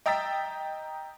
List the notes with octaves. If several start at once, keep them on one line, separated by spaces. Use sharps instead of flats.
D#5 G5 A#5 E6 A6 B6